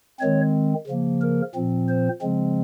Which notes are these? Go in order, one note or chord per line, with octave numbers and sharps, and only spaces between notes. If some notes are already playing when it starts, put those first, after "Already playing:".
D#3 G#3 C4 C#5
C#3 F3 A#3
A#4
A#2 F3 C4
C5
C#3 F3 G#3 C4